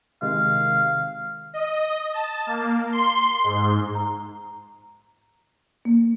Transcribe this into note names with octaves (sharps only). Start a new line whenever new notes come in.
C3 D#3 G#3 F5
D#5
A5
A#3
C6
G#2
A#5
A#3